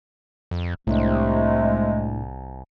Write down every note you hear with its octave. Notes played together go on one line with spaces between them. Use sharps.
F2
C2 A2 C3 G#3 A3 D4